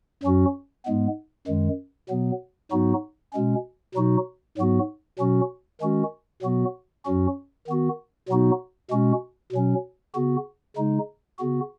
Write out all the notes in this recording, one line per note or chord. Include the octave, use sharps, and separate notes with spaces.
F#2 F#3 C#4 F#4
G#2 G#3 B3
F#2 D#3 G#3
B2 F#3 B3
G#2 F#3 B3 D#4 F#4
B2 G#3 C#4
B2 F#3 D#4 F#4
G#2 F#3 B3 F#4
B2 F#3 C#4 F#4
D#3 G#3 C#4 F#4
B2 F#3 B3 F#4
F#2 F#3 C#4 F#4
D#3 B3 F#4
B2 F#3 B3 D#4 F#4
B2 G#3 C#4 F#4
B2 F#3 C#4
C#3 B3 F#4
C#3 G#3 D#4
C#3 B3 F#4